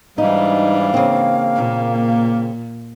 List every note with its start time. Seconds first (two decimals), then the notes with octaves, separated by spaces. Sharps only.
0.18 G#2 E3 G3 D4 D#4 F5
0.94 C#3 A#3 C4
1.56 A#2